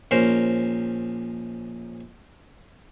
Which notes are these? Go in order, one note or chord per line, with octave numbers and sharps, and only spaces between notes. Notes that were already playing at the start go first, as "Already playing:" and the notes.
A#1 C#4 A#4 C5